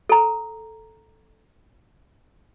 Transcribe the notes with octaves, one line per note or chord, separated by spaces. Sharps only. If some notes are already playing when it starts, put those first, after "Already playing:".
A4 A#5